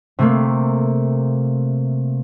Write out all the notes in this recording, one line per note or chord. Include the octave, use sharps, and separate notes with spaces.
C3 A3 A#3